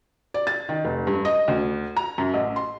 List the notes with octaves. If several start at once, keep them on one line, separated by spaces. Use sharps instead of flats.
D5
A6
D#3
F1
G2
D#5
D2
A#5
F#2
A1
C6